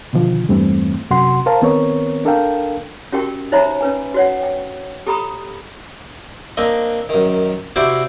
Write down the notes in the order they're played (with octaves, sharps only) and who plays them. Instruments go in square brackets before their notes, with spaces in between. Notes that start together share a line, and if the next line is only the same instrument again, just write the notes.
[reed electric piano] B2 D3 D#3 F3
E2 G2 E3 G3 A3 C4
F#2 C3 F#4 F#5 C6
A#4 C5 F5 A5 A#5
D#3 B3 C4 A#4 C#5
D4 A4 A#4 F5 G5
[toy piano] C#4 F#4 G4 A#4 G5 C#6
D#4 C5 C#5 E5 A#5 B5
C#4 B4 G#5
F#4 C#5 F#5
G5
G4 A4 A#5 B5 C#6 D#6
[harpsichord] A#3 C4 D4 D#5
F#2 D#3
C3 E4 F#4 C5 D5 D6